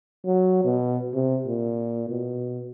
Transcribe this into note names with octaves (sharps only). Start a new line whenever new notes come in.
F#3
B2
C3
A#2
B2